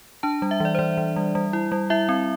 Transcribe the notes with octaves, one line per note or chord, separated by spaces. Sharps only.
D4 A5
G3
E5
E3 D5
C5
E3 D5
E3
G3
G3
E4
G3
E4 E5
C4